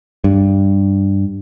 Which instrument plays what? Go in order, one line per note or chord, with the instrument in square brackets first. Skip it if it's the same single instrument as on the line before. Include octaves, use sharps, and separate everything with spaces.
[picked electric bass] G2